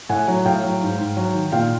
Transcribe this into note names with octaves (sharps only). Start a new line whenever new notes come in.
A2 F#5 G#5
F#3
A2 F5 G5
F#3
G#2
G#2
F#3
D#3
A#2 F5 G5